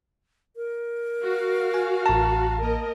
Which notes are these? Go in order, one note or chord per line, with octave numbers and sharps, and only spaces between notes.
A#4
F#4 F5
G#5
A1 A5 A#5
A#3 A#4 D#5